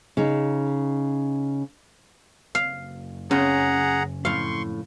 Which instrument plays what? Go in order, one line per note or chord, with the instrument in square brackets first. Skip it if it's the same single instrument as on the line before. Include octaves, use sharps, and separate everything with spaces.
[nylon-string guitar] C#3 D#4
[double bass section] F#1 [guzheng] F5
[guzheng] C#3 [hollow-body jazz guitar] C#4 C6 [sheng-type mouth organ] G#4 F#5 A#5
[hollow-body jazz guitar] F2 A2 [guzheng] F5 [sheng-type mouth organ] C6 C#6